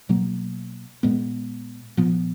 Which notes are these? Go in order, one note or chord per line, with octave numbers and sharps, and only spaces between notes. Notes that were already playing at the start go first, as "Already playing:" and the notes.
B2 F#3 A#3
A#2 G#3 B3
A#2 F3 B3